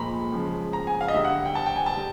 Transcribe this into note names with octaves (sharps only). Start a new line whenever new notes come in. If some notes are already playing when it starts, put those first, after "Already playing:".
Already playing: A#2 F3 G#3 A#5 B5
C#3 F3 G#3
A#5
G#5
F5
D#5
D3 G3 E5
F#5
G5
A5
G5
G#5
A5
G3